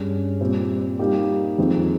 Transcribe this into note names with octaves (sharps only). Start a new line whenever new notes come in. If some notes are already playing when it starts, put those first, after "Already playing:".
Already playing: G2 G3 C#4 G#4 C#5
A#2 G3 C4
G3 A#3 D#4 G4
F2 D#3 G#3 C4 D#4